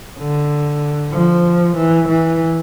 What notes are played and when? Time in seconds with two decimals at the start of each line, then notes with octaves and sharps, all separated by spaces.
0.18 D3
1.13 F3
1.77 E3
2.08 E3